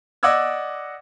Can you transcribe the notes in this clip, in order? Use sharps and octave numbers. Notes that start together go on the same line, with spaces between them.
D5 D#5 F#5 D6 E6 G#6